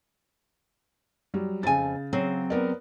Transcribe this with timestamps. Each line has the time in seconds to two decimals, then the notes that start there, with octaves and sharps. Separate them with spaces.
1.34 F#3 G3
1.63 F2 C#3 G#5 A6
2.13 F#3 C4 G#4
2.50 B3 A#4 D5